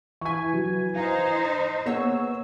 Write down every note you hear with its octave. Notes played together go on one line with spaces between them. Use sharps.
E3 G#5 C#6 B6
F#3
D#4 C5 F5
A#3 B3 G#4 C#5 F#5 E6